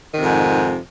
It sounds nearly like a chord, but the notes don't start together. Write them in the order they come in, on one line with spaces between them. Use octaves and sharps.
D#3 C3 F2 G#2